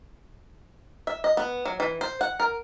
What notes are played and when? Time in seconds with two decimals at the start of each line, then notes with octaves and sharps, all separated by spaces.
1.07 E5
1.24 D#5
1.37 B3
1.65 F#3
1.80 E3
2.01 C5
2.21 F#5
2.40 A#4